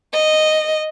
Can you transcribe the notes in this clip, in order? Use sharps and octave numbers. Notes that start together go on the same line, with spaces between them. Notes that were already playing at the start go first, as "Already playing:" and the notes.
D#5